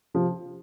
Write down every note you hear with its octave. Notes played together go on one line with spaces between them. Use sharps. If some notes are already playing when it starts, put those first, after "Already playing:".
C3 F3